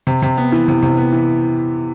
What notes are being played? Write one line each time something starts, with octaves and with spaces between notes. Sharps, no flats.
C3
C3
B3
E3
C3
C3
B3
E3